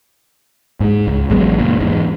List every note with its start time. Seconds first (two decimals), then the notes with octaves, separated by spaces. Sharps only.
0.80 G#2 G#3
1.07 C#2
1.30 A1 F#3 G#3 B3
1.58 F#1 A#2
1.80 E2 G#2